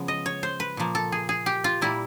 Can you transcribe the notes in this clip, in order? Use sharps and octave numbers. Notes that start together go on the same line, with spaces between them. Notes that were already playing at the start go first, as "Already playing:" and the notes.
Already playing: C#3 F3 G#3 B3
D#5
C#5
C5
B4
A#2 F3 A#3
A4
G#4
G#4
G4
F4
A#2 G3 A#3 E4